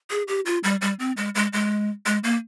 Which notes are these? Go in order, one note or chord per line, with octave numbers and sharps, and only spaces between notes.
G#4
G4
F4
G3
G3
C4
G#3
G#3
G#3
G#3
A#3